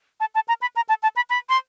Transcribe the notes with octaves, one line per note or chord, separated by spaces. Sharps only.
A5
A5
A#5
B5
A#5
A5
A5
B5
B5
C6